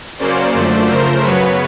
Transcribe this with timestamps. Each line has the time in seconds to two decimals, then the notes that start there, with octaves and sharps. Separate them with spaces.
0.18 C#3 F#3 A#3 C#4 C5 D5
0.53 F#2 D3 F3 A3
0.87 C#3 F3 A3 A#4 C5
1.22 F#2 C#3 F#3 B3 B4 C#5